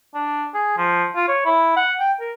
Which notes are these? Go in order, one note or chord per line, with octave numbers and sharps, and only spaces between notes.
D4
G#4
F3
F4
C#5
E4
F#5
G5
A#4